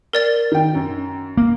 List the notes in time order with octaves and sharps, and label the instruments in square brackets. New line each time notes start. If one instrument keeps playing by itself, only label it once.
[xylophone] A#4 D5 A6
[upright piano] D#3 G5
F#2
[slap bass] A#3